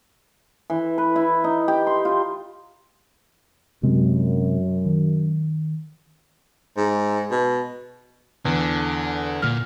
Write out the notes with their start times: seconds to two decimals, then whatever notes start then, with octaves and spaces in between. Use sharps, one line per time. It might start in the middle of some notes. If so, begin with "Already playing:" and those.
0.70 E3
0.98 B4
1.16 E4
1.44 D#4
1.68 G4
1.87 C6
2.05 F4
3.83 F#2 C3 G#3 C4
4.86 D#3
6.77 G#2
7.31 B2
8.45 E2 D3
9.42 A#2 F6